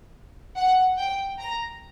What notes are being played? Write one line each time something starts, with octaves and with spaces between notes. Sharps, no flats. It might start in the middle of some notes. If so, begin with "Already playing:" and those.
F#5
G5
A#5